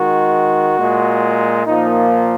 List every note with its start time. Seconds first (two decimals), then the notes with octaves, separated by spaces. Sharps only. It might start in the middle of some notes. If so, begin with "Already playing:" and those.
Already playing: D#3 G#3 F#4
0.78 A#2 G#3
1.67 A#2 F3 A#3 D#4